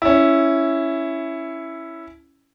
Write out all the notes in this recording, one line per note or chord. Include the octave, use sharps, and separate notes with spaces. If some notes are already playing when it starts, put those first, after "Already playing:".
C#4 E4